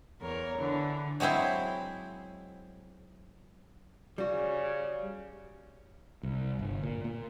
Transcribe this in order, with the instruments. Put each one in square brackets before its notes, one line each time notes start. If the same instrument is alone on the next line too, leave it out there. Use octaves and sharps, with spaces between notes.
[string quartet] E2 A#4 C#5
D3 E3
[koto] F#3 G#3 C4 E4 C5
[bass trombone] C#3 [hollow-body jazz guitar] G3 F#4
[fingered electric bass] C2
G1
A#2
A#2